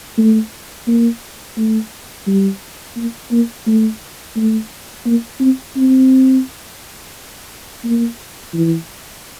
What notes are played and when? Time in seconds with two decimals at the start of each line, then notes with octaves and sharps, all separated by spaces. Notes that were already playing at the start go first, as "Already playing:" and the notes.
0.18 A3
0.88 A#3
1.57 A3
2.27 G3
2.96 A#3
3.32 A#3
3.67 A3
4.36 A3
5.06 A#3
5.40 C4
5.76 C4
7.84 A#3
8.54 E3